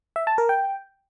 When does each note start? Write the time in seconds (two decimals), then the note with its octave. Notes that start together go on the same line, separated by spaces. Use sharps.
0.16 E5
0.27 A5
0.38 A#4
0.49 G5